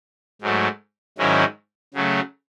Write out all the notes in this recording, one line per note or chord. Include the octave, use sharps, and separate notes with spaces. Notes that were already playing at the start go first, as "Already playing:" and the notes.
G#2 F#3 A3
G#2 D#3 F#3 C#4 E4
C#3 F#3 A3